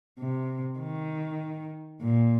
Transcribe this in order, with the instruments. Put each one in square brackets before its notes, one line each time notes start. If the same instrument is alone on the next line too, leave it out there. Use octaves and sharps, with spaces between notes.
[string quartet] C3
D#3
A#2